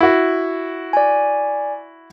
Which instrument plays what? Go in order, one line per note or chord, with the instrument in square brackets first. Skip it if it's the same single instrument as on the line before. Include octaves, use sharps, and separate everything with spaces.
[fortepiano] E4 F#4
[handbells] D5 G#5